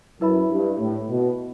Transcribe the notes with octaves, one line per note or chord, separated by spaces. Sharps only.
F#2 E4 B4 E5 B5
G2
A2
B2